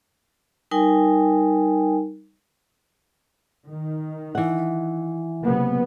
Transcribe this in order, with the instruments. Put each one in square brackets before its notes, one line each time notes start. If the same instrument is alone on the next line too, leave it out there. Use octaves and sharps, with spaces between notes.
[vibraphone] G3 D#4 A#4 G5 G#5
[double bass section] D#3
[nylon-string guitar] E3 F#5
[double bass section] F#1 C3 B3